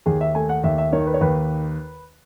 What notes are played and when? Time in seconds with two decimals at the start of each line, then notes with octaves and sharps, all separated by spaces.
0.06 D#2 G#4
0.21 E5
0.35 A3 G#5
0.49 F#5
0.64 D#2 E5
0.78 E5
0.92 D#3 C#5
1.07 B4
1.14 C#5
1.21 D#2 B4